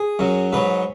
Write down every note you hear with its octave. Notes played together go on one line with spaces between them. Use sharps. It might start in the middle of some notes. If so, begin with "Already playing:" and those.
Already playing: G#4
F#2 F#3
G#2 F#3 B4